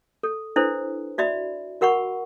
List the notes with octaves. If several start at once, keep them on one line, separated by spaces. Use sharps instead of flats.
A4
D4 E4 A4 B4 C5
F#4 D5 E5 B5
F#4 A#4 F#5 B5 C#6